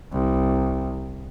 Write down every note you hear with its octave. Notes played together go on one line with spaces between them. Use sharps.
C2